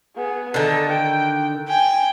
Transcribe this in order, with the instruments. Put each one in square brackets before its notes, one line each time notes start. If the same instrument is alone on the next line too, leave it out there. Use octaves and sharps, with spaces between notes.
[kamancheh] B3 G#4
[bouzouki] D3 D#3 [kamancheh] A4
[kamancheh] G5
[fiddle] G5 [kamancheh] G#5